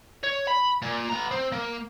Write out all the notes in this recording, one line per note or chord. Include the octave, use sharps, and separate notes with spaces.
C#5
B5
A#2
B3 A#5
C4
A#3